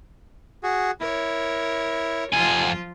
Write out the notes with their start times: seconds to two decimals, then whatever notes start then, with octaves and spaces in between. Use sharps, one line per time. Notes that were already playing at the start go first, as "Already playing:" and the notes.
0.63 F#4 G#4
1.01 E4 A#4 C#5
2.32 F2 F3 F4 G#5